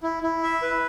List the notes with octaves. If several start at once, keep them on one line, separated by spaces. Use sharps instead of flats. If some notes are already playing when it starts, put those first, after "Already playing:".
E4
E4
E5
B4